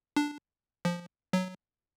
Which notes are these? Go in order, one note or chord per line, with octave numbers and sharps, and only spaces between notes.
D4
F3
F#3